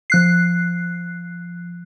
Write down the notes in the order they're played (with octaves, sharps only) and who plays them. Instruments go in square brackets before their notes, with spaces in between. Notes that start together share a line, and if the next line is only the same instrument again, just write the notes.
[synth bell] F3 F#6 C7